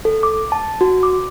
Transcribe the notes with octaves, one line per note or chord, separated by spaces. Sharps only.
A4
D6
A5
F#4
D6